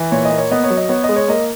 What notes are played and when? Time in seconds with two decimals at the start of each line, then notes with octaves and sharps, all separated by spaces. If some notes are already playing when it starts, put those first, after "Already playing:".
Already playing: E3
0.12 A#2 C#5
0.25 D#5
0.32 A#3
0.38 C#5
0.51 B3 D#5
0.64 C#5
0.70 F#3
0.77 D#5
0.89 B3 C#5
1.04 G#3 D#5
1.16 C#5
1.28 A#3 D#5